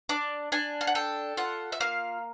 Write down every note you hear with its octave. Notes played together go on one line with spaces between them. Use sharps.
D4 D6
D4 G#5
F5
F#5
A4 G5
F4 F#5
E5
A#3 F5